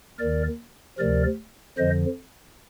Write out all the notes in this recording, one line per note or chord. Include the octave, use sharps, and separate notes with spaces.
D#2 D#3 A#4 D5
D2 C3 F3 A#4 D5
F2 D3 F3 C5 D#5